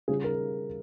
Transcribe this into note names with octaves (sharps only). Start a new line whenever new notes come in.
C#3 G3 C#4 F4 G#4
A#4